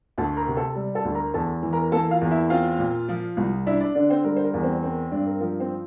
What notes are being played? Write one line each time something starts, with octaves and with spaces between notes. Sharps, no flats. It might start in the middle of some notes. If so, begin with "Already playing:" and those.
D2 A4 A5
A#4 A#5
C3
A4 A5
G3
A4 A5
D2
A#4 A#5
E2 A4 A5
E3
A#4 A#5
A#3 A4 A5
F4 F5
E2
E4 E5
C4 F4 F5
A#2
F3
C2
D4 E4 E5
D4 D5
D3 D4 D5
C4 C5
G3 A#4
C5
A#4
E2
C4 C5
C4 A#4
G2 D4 D5
A#4
F3 A#4
C4 C5